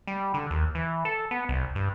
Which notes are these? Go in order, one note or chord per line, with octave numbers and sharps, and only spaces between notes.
G3
D3
D#2
E3
A4
B3
C2
G2